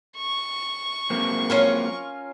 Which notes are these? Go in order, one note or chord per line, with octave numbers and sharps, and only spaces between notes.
C#6
F#3 A#3 C4
C#4 F4 A#4